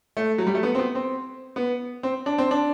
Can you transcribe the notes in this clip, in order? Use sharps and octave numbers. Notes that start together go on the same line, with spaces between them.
A3
F#3
G3
A3
B3
C4
B3
C4
B3
C4
D4
C4
D4